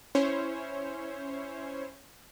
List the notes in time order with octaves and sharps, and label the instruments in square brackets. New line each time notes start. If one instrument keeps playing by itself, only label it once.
[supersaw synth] C#4 E4 C5 C#5